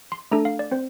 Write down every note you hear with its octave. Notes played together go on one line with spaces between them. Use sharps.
C6
A3 D4 A4 A#5
F5
D5
C4 C5